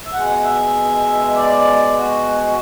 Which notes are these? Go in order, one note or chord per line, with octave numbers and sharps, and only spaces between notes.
E5
B2 G#3 F#5
E5
D5
G#4
F#4